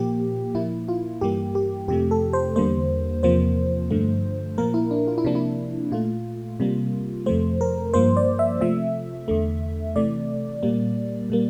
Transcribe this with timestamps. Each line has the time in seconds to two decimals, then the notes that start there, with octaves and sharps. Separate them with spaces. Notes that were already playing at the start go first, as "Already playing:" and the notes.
Already playing: A#2 F3 A#3 G4
0.55 A#2 F3 A#3 E4
0.88 F4
1.21 G2 E3 G3 A#3 G4
1.55 G4
1.88 F2 C3 F3 A3 G4
2.11 A4
2.33 C5
2.56 E2 D3 G3 A#3 C5
3.23 E2 C3 F3 A#3 C5
3.91 G2 D3 F3 A3
4.58 A#2 F3 A#3 A#4
4.74 E4
4.91 D4
5.07 F4
5.18 E4
5.25 C3 F3 A#3 D4
5.35 E4
5.92 A#2 A3 F4
6.60 C3 G3 A#3
7.26 F2 C3 F3 A3 C5
7.61 A#4
7.94 G2 F3 A#3 C5
8.17 D5
8.39 E5
8.61 C3 F3 A3 E5
9.28 E2 D3 A3
9.96 C3 E3 A3 D5
10.63 A#2 G3 A#3
11.30 A#2 G3 A#3